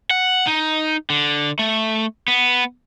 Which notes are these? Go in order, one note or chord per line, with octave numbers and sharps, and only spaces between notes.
F#5
D#4
D3
A3
B3